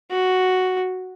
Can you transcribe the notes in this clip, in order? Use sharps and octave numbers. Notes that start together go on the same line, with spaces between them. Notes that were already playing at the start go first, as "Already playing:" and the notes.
F#4